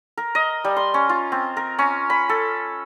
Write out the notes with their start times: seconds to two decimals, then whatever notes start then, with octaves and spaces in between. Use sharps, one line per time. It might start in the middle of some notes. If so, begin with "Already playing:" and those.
0.17 A#4
0.35 D#5
0.64 G3
0.77 C6
0.94 C#4
1.09 F4
1.32 C4
1.57 A#4
1.79 C#4
2.10 B5
2.29 A4